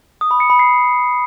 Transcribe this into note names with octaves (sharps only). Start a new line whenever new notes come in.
D#6
B5
C#7
B5
C7